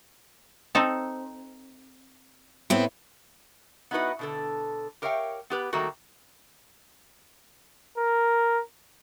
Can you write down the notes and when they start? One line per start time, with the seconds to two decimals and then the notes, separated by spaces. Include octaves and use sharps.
0.75 C4 D#4 A4
2.70 A2 B3 C4 E4
3.91 B3 D#4 E4 F#4 B4 D#5
4.19 B2 D3 A4
5.02 G4 A#4 C#5 E5 F5 G5
5.50 B3 G4 B4
5.73 D#3 G3 A3 A#3 F#4
7.98 A#4